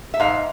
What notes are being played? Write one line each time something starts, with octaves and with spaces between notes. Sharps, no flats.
E5
G#2 F5